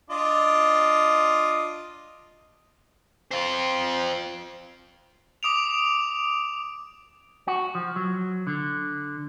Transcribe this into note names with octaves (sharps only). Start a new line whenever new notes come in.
D4 F4 D#5
C4 F4
D6 D#6 D7 F7
F#4
F3
F#3
D3